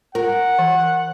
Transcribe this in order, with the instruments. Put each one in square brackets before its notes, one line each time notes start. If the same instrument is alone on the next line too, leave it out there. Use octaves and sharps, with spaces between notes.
[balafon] F4 [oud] A#4 [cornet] F#5
[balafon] E3